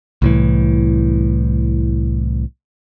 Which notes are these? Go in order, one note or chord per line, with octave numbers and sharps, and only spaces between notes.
C2 A2 E3